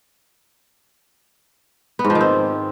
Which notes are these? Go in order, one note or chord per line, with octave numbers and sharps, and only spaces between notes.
B3
G#2
F3
D#3
C4